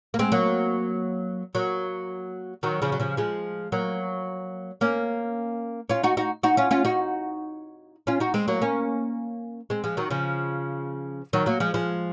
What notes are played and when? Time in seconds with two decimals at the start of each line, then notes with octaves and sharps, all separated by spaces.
0.14 A#3
0.19 G#3 C4
0.32 F#3 A#3
1.55 F#3 A#3
2.63 D#3 F#3
2.82 C#3 F3
2.92 F#3
3.00 C#3 F3
3.17 F3 G#3
3.72 F#3 A#3
4.81 A#3 C#4
5.90 C#4 F4
6.03 D#4 F#4
6.17 D#4 F#4
6.43 D#4 F#4
6.57 C#4 F4
6.71 C#4 F4
6.85 D#4 F#4
8.07 C#4 F4
8.20 D#4 F#4
8.34 G#3 C4
8.48 F#3 A#3
8.61 A#3 C#4
9.70 G#3 C4
9.84 F3 G#3
9.97 D#3 F#3
10.10 C#3 F3
11.33 D#3 F#3
11.46 F#3 A#3
11.60 F3 G#3
11.74 F3 G#3